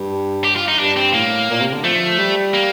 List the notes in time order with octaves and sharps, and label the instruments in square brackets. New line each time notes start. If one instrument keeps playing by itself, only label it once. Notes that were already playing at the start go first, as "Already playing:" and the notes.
Already playing: [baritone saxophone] G2
[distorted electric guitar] G4
F4
D#4
[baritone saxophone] G2 [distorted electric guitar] D4
[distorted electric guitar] C4
[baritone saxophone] A2 [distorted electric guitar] A#3
[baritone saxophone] A#2
C3
D3
[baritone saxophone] F3 [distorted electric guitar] A3
[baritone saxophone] G3
[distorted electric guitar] A#3